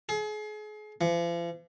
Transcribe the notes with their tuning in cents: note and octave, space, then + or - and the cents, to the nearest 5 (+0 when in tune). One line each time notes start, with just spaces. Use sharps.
G#4 +35
F3 -45